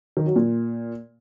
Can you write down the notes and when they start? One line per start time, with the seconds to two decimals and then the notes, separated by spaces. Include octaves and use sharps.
0.17 D#3
0.26 F#3
0.36 A#2